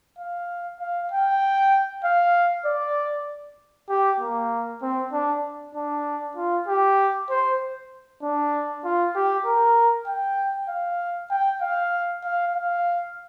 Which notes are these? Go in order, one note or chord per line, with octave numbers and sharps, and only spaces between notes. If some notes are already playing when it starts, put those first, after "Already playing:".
F5
F5
G5
F5
D5
G4
A#3
C4
D4
D4
F4
G4
C5
D4
F4
G4
A#4
G5
F5
G5
F5
F5
F5